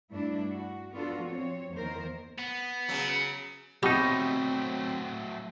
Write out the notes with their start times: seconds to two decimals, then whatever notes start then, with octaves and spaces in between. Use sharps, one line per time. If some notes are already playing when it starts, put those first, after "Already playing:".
0.12 G2 A3 D4 E4
0.51 F#4
0.93 B3 D4 F4 F#4 A4
1.22 F3 C4 C#5
1.73 E2 D#3 A#3 A#4 C5
2.38 B3
2.88 C#3 F#3
3.83 B2 F#3 A3 C4 D#4 G4